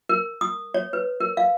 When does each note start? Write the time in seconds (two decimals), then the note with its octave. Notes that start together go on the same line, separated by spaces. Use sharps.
0.09 A#4
0.41 D#6
0.74 C#5
0.93 B4
1.20 A#4
1.37 F5